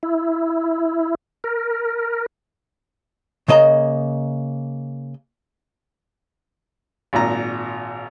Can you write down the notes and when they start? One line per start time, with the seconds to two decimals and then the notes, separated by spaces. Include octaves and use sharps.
0.03 E4
1.44 A#4
3.48 C#3 A#3 D#5 F5 A#5
7.13 G#1 A#2 A#5